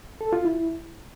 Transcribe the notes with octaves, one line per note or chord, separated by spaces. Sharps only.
A4
F4
E4